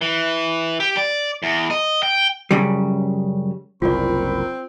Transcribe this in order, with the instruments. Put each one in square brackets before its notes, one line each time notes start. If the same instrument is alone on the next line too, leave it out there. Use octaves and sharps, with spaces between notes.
[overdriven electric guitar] E3
G4
D5
E2
D#5
G5
[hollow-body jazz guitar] F#2 C#3 G3
[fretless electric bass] F#1 C2 [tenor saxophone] C4 [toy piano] F4 D5 [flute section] A#4 B5 C#6